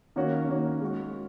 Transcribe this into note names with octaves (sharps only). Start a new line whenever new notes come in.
D#3 A#3 C#4 F#4
D#3 A#3 C#4 F#4
G#3 C#4 F#4